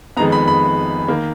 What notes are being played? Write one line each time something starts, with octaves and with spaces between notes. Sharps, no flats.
F2 D#3 G#3 B3 A#5
B5
B5
D#3 A#3